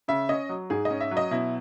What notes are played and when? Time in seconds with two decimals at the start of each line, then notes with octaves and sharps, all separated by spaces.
0.08 C#3 E5
0.29 C#4 D#5
0.49 F#3
0.70 G#2 G#4
0.85 D#5
0.91 C#4
1.01 E5
1.11 F#3
1.17 D#5
1.31 B2 E4